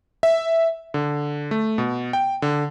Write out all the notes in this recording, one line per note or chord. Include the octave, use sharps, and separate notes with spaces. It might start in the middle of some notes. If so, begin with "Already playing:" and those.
E5
D3
A3
B2
G5
D3